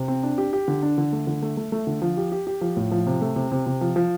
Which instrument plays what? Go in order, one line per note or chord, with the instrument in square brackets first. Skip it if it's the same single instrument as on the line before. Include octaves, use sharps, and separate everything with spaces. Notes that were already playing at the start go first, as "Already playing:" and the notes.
Already playing: [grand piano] C3
C4
D4
G4
G4
D3
D4
D3
A3
D3
A3
A3
A3
D3
F3
G4
G4
G4
F3
A2
F3
C3
A3
C3
C3
C3
F3
F3